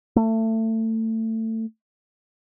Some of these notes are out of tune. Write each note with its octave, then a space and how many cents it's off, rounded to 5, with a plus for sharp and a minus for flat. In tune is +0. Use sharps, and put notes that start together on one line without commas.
A3 +25